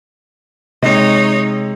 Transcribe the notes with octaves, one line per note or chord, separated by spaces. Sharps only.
C3 G#3 D#4 C#5